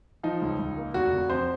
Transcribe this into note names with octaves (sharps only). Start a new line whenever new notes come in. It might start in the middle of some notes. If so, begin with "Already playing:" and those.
F3 D#4
C#2
C#2
A#3
F1 F#4
C3
F2 C5